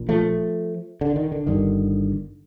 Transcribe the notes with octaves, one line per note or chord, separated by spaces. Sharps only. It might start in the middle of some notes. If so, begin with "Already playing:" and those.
Already playing: A#1 A#2
F3 A3
D3
D#3
D3
G1 G2 D3 D#3